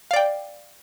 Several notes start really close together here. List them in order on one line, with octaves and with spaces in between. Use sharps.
F5 D5 G5